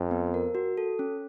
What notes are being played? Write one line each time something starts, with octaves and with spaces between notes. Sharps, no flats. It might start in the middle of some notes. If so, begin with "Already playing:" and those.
Already playing: F2
B3
A#4
F#4
A4
C#4